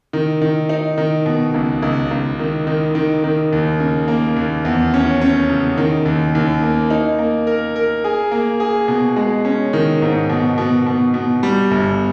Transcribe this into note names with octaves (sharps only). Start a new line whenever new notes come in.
D#3
D#3
D#4
D#3
B2
C#2
C#2
C#2
D#3
D#3
D#3
D#3
D#2
C#3
A#3
D#2
E2
C#4
C#4
C#3
D#3
D#2
D#2
A#3
D#4
A#3
A#4
A#4
G#4
A#3
G#4
B2
G#3
C#4
D#3
G#2
B2
B2
B2
B2
G3
G1